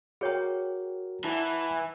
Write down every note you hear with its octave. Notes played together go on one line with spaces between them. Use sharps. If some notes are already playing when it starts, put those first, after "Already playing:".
F#4 G#4 A#4 C#5 G5
E3 E4 F#5 A5